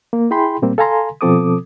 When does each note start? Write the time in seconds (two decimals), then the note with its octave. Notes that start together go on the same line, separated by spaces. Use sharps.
0.13 A#3
0.31 E4 G#4 G5 B5 C6
0.62 A#2 G3 A#3 C4
0.78 A4 F5 G#5 A#5 C6
1.21 B2 F3 C4 A4 D6 D#6